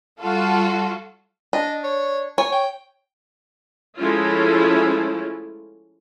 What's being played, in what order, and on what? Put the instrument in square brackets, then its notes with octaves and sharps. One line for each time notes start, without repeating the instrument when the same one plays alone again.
[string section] G3 F4 F#4 A4
[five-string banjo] D4 [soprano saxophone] D#5
[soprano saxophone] C#5
[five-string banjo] C#5 [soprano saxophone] G#5
[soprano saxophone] G5
[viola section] F3 G#3 A3 C#4 E4 F4